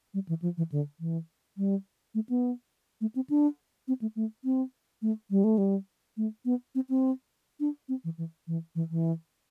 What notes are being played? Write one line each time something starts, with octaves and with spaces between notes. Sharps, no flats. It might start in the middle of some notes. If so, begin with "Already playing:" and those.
G3
E3
F3
E3
D3
E3
G3
A3
B3
A3
C4
D4
C4
A3
A3
C4
A3
G3
A3
G3
A3
B3
C4
C4
D4
C4
E3
E3
E3
E3
E3